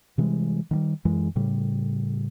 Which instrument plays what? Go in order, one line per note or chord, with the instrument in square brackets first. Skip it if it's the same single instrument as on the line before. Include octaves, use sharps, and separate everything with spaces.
[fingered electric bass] C3 E3 G3 G#3
D#3 F#3 G3
F#2 E3 G#3
A2 C#3 G3